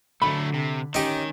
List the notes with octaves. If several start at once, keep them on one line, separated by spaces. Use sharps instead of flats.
D3 F#3 A3 B5
C3
D#3 C#4 D#4 G4